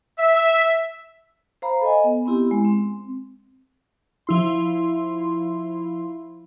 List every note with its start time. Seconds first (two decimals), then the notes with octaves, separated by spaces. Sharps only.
0.19 E5
1.62 C5 F5 A#5 B5
1.81 A4 D#5 G#5
2.04 B3
2.26 B3 C4 E4 G4
2.51 G#3
2.65 C4
4.27 F3 E4 C6